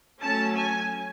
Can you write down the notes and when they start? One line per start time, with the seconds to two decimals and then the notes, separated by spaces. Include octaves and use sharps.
0.21 F#3 A3 C#4 A5
0.56 G#5